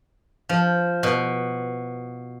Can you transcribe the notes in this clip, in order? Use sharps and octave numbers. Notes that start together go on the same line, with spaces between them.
F3
B2